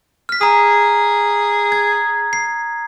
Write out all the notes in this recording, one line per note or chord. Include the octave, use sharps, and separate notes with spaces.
F6 B6
G#4 A#5 D#6
G#6
C7